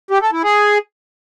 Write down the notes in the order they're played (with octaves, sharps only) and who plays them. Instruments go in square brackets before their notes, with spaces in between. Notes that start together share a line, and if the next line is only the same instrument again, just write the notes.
[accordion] G4
A4
E4
G#4